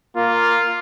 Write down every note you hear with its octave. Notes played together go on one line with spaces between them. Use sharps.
A#3 F4